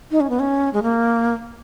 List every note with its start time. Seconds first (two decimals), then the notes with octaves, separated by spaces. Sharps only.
0.11 D#4
0.20 C#4
0.30 B3
0.39 C#4
0.73 G#3
0.83 A#3